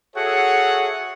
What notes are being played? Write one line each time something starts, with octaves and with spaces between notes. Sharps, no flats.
F#4 G#4 A4 C#5 E5 F#5